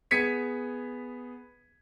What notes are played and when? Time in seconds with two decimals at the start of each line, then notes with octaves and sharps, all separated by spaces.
0.11 B3 G#4 G#6 B6 C#7 D#7